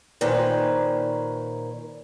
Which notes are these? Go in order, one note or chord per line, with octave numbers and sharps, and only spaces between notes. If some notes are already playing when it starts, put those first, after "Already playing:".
A#2 D#3 C#4 B4 C5